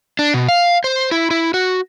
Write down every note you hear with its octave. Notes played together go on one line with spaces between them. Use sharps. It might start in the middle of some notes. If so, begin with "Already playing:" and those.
D4
B2
F5
C5
E4
E4
F#4